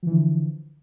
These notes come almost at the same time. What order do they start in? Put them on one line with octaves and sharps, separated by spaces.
F3 E3 D3